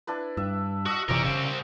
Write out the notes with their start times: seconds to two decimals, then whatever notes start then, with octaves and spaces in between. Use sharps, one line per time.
0.07 D4 E4 B4
0.37 G2 E5
0.86 F#4 D#5 E5
1.09 F#1 C3 E3 G4 A#4 D5 C#6
1.24 C2 C#3 C4